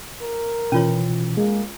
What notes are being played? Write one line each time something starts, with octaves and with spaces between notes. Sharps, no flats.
A#4
B2 E3 C#4 F4 C#5
G#3 A#3 G#4